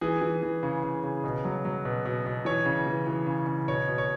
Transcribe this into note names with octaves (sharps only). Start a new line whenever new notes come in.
E3 G#4
E3
E3
C#3
C#3
C#3
B2
F#3
F#3
B2
B2
B2
E3 C#5
C#3
E3
E3
C#3
C#3
B2 C#5
B2
C#5